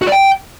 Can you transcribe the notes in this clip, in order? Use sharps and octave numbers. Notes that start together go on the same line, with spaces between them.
F#4
D5
G5